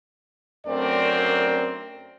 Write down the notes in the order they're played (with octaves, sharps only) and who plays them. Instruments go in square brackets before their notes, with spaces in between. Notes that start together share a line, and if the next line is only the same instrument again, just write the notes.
[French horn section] F#2 A3 C4 D4 A#4 D5